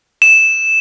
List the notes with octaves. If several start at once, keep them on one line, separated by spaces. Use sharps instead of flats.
E7